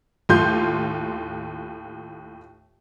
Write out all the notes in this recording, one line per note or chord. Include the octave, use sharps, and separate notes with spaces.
D#2 A2 F4 C6 G6